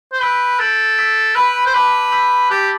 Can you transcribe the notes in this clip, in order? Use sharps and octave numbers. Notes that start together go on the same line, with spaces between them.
C5
B4 E6 G6 B6 D7 G7
A4 E6 G6 D7 F#7
E6 B6 D7
B4 B5 F#6 B6 D7
C5
B4 A5 D6 F#6
E6 G6 B6 F#7
G4 A5 D6 A6